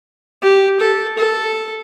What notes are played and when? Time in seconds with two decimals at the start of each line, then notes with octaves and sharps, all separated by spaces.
0.42 G4
0.80 A4
1.18 A4